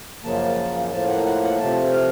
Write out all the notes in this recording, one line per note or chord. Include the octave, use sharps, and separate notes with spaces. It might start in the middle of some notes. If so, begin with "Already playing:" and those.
F#2 C#3 F3 A#3 A5
A2 F3 A#3 A5
F#5
F#5
F#5
C3 F3 A3 A5
F5